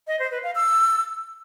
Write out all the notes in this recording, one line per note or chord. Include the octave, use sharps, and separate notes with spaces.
D#5
C5
B4
F5
E6